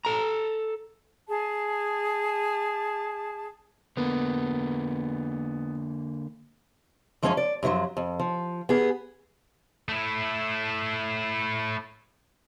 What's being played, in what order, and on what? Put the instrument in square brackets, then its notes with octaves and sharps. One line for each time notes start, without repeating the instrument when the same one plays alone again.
[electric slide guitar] A4 A#5
[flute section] G#4 A5
[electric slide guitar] D3 A#3 [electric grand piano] B3
[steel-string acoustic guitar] F#2 F3 G#3 C#4 C#5 G#5
D5
F#2 B2 D#3 F3 F#3
F2
F3
B3 G#4
[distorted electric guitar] A3 E4